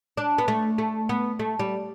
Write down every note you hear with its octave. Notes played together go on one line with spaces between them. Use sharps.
D4
B3
A3
A3
B3
A3
G3